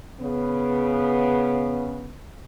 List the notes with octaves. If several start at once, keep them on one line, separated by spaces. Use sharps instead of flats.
C#3 B3